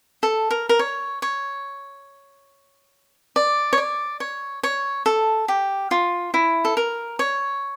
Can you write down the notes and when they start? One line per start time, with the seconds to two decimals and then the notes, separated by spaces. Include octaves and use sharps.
0.23 A4
0.51 A#4
0.69 A#4
0.79 C#5
1.22 C#5
3.36 D5
3.73 C#5
3.78 D5
4.20 C#5
4.63 C#5
5.06 A4
5.48 G4
5.91 F4
6.34 E4
6.65 A4
6.77 A#4
7.19 C#5